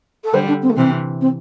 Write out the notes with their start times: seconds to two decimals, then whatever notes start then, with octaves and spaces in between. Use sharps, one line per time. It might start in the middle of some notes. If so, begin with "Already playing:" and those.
0.24 A4
0.33 D3 G3 C5
0.48 D4
0.62 C4
0.69 A3
0.76 C3 E3 C4
1.21 C4